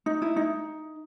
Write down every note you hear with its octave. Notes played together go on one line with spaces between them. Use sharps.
D#4
E4
D#4